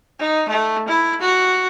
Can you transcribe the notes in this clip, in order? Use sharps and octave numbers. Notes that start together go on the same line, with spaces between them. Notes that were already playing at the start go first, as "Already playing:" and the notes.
D#4
A3
E4
F#4